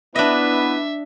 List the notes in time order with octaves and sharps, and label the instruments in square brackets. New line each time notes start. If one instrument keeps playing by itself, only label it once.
[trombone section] B3 E4 [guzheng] D4 D#5 [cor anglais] B4 [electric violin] E5